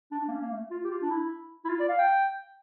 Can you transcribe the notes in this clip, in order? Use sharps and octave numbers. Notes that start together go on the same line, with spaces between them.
D4
D4
A#3
C#4
A#3
A3
F4
G4
F4
D4
E4
E4
F4
D5
F5
G5